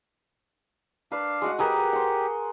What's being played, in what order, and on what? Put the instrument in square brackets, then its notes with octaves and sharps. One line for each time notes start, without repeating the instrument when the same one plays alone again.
[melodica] D4 F5 [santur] B4
[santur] G#3 F#4 F#5
[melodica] G4 [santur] G#4 A#4 B4
[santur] C5 F#5